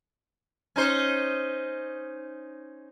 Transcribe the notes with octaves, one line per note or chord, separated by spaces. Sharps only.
C#4 D#4 C5